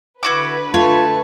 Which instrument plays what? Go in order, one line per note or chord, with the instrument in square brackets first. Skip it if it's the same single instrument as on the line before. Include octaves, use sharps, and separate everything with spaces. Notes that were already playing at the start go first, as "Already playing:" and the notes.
[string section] D3 B4 [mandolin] E4 F#4 D6
[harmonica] A3 A5 [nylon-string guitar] F4 [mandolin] C#5